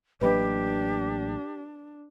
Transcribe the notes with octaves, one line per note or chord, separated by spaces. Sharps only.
A1 F#3 A#3 D4 G4 B4 D#5 B5